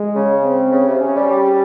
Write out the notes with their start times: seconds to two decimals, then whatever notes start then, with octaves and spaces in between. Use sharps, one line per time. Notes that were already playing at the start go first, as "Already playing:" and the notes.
Already playing: G#3
0.16 C#3
0.44 C4
0.72 C#3
0.87 C3
1.01 C#3 C#4
1.16 G3
1.30 G3